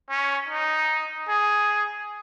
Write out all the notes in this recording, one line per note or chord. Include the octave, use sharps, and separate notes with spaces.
C#4
D#4
G#4